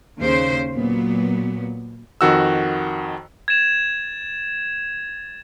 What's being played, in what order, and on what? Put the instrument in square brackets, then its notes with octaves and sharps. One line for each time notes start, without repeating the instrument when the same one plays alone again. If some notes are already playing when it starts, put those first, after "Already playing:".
[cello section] D#2 C#3 C5
A#2 F#3 B3
[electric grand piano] F2 D#3 F#4 E6
[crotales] G#6 A6 E7 F7